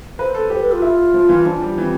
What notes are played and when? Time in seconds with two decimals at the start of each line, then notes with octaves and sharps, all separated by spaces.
0.19 B4 C5
0.35 A4
0.50 G4
0.61 B4
0.72 F4
0.82 E4
1.14 F3
1.29 E3
1.46 F3 D4
1.62 G3
1.78 E3 C4